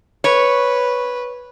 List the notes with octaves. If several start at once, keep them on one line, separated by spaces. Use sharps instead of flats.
B4 C#5